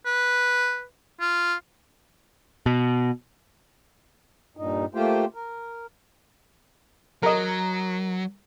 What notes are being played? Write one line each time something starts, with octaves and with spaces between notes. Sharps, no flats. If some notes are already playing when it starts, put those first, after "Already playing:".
B4
F4
B2
G2 A#2 D#4
A3 A#3 F4 G4 C5 G5
A#4
F#3 A#4 D#5